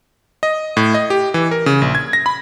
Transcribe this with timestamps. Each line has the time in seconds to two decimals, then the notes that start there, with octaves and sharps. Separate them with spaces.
0.43 D#5
0.77 A2
0.94 D#5
1.10 G4
1.34 E3
1.51 A#4
1.66 C#3
1.82 A#1
1.95 G#6
2.13 A#6
2.26 B5